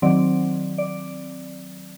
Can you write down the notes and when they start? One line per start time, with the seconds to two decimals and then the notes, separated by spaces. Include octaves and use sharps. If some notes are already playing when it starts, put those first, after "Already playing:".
0.02 D#3 F#3 C4 D5
0.78 D5